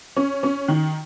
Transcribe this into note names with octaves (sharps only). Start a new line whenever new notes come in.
C#4
C#4
D#3